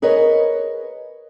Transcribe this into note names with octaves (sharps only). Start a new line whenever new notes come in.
G#4 A#4 B4 C#5 D#5